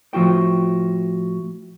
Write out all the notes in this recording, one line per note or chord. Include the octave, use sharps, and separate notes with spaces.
A2 F3 F4 F#4 G5